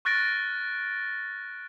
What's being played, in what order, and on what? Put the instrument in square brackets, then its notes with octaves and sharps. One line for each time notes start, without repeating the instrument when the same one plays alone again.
[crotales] C#6 F6 F#6 A6 A#6 D7